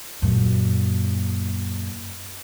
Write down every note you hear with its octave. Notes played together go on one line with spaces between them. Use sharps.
F#2 A#2